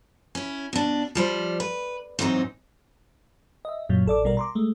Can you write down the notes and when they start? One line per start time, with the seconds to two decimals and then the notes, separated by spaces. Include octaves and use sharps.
0.35 C#4 E4
0.73 B2 D4
1.15 F3 G3 C5
1.60 B4
2.19 G#2 E3 F#3 B3 C4 D#4
3.65 D#5 E5
3.89 F#2 A#2 F#3
4.06 A1 A4 D5 D6
4.24 A#1 B2 G3 A#4 D5
4.37 A#5 C6 D6
4.55 G#3 A3